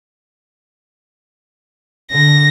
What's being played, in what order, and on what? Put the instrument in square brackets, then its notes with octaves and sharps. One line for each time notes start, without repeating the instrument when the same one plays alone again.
[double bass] D3 [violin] A#6